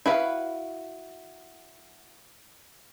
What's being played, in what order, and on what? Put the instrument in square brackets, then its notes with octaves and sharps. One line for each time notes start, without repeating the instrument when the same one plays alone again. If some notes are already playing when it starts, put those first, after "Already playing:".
[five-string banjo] E4 F#4 B4 F5